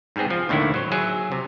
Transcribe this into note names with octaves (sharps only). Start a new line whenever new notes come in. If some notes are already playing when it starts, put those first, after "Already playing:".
G#2 G3 B3 C4 G#4
F3
D#2 A2 D3 D#3 E4
F#3 C5 C#5
F#3 G#4 E5
C3